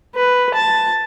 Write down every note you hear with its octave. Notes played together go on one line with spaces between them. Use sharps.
B4
A5